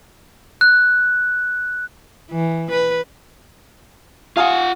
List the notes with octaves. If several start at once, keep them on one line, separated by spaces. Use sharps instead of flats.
F#6
E3
B4
F4 F5 F#5 G#5 D#6